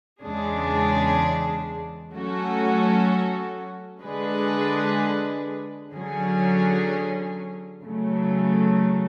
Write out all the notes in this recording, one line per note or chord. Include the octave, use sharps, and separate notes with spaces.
E2 C#3 G#3 D4 G#4
F#3 A3 C#4 F#4 A4
D3 G#3 D4 G#4 B4
D3 F#3 C#4 G#4
C#3 F#3 A3